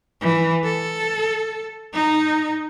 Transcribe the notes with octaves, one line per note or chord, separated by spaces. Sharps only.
E3
A4
D#4